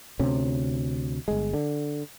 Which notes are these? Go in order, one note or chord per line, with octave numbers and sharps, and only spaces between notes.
D2 C3 C#4
G1 G#3
D3